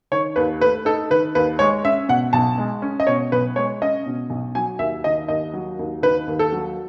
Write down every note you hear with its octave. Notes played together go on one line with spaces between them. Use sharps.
D#3 C#5
D#2 B4
A3 B4
D#4 A4
D#3 B4
D#2 B4
G#3 C#5
C#4 E5
B2 F#5
B1 A5
G#3
C#4
D#5
B2 C#5
B1 B4
G#3 C#5
C#4 D#5
B2
B1
F#3 G#5
D#2 E5
D#3 D#5
D#2 D#5
F#3
D#2
D#3 B4
D#2
A4
F#3